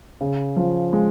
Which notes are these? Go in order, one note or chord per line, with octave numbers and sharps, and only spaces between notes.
C#3
F3
G#3